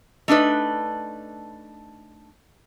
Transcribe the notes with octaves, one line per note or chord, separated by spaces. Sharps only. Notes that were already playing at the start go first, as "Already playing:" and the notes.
A3 D4 D#4 B4